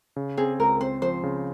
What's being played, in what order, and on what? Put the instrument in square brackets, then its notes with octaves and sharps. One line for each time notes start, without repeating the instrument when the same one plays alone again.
[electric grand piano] C#3
[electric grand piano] C4 [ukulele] G#4
[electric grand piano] C#2 [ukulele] A#4
[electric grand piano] C4 [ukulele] C5
[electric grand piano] F3 [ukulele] C5
[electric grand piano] C#3